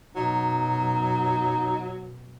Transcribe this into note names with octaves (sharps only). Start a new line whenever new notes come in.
F#2 B2 F#3 D#4